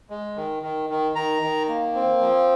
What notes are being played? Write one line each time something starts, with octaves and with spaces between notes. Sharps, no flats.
G#3
D#3
D#3
D#3
D#3 A#5
D#3
A#3
C4
F3